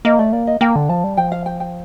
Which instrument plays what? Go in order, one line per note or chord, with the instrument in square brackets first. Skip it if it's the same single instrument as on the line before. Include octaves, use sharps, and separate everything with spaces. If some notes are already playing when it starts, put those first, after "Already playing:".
[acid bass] A#3 [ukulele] D#5
[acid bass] A3 [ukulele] D5
[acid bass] A#3 [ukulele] D5
[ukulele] D#5
[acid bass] A#3 [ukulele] G5
[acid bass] D3
[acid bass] F3 [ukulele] A5
[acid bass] G3
[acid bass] F3 [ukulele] G5
[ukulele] F5
G5
G5